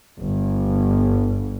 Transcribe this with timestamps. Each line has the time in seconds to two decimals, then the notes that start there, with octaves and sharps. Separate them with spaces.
0.20 G1